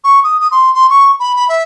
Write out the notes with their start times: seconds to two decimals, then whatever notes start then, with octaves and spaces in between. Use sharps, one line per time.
0.04 C#6
0.24 D#6
0.40 D#6
0.51 C6
0.74 C6
0.90 C#6
1.20 B5
1.36 B5
1.49 E5